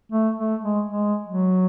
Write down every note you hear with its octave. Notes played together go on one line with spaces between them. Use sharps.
A3
A3
G#3
G#3
F#3